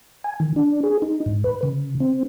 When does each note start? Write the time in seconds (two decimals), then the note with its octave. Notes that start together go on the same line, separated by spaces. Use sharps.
0.24 G#5
0.40 D#3
0.56 D4
0.83 G#4
1.02 D#4
1.26 G#2
1.44 B4
1.63 C#3
2.00 C4